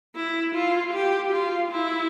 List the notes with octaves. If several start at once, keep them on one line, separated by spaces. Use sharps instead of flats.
E4
F4
G4
F4
E4